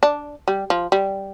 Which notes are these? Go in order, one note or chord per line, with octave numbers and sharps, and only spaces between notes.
D4
G3
F3
G3